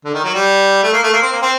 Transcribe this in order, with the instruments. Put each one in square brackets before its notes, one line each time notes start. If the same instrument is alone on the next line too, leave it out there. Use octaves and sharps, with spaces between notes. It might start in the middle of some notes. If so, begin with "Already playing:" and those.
[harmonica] D3
D#3
F#3
G3
A3
A#3
A3
A#3
C4
A#3
C4